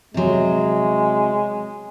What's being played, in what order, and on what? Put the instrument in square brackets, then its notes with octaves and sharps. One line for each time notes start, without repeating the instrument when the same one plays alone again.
[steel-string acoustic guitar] C3 F#3 [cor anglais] G#3